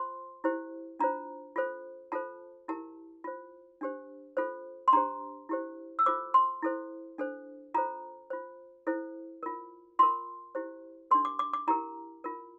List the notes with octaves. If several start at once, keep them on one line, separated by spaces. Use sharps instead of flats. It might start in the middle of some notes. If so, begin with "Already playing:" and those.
Already playing: F4 C5 C6
E4 G4 C5
D4 F4 C5 A#5
F4 A4 C5
F4 A4 C5 A5
E4 G4 A#4 A5
F4 C5
D4 G4 C5
F4 A4 C5
C6
D4 G4 C5 A#5
E4 G4 C5
E6
F4 A4 C5 D6
C6
E4 A4 C5
D4 A4 C5
F4 A4 C5 A#5
F4 C5
E4 A4 C5
F4 A#4
F4 A#4 C6
E4 G4 C5
D4 G4 A#4 C6
D6
D6
D6
E4 G4 A#4 A#5
F4 A#4